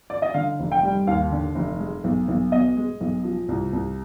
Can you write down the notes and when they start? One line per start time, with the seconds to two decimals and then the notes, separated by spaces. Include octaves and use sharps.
0.10 D5
0.22 D#5
0.34 D3 F5
0.59 F1
0.71 G5
0.83 G3
1.07 D#2 F5
1.31 D3
1.55 F1
1.80 G#3
2.04 B1
2.28 B1
2.52 B2 D#5
2.77 G#3
3.01 B1
3.24 F3
3.48 C2
3.73 C2